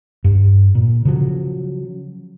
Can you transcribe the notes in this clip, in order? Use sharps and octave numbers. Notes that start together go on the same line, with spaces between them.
G2
A#2
C#3 F3 F#3